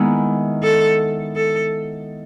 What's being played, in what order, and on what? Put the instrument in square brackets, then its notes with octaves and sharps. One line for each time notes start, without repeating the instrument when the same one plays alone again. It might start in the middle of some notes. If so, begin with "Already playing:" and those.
Already playing: [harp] D#3 G#3 B3 E4
[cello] A4
A4